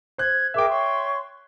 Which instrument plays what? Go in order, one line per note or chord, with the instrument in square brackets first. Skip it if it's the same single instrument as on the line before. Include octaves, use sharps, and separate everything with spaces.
[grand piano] C5 F#6 [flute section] G#6
[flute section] G#4 A#4 D6 [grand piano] E5 G5
[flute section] C#5 C6 C#6